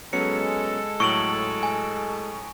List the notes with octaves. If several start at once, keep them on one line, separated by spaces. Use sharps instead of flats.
F#3 G#3 B3 C#4 A4 C#7
A2 F#3 C#6 D7 F#7
G#5